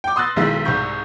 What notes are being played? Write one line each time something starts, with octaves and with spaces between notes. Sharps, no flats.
G5 D6
C6 D#6 E6 F#6 A6 A#6
B1 D#3 G#3 E4 C6 E6
C2 G#2 C#6 G6